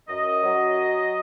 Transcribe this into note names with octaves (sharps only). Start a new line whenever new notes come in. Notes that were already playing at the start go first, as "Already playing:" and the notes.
F#2 D#5
F#3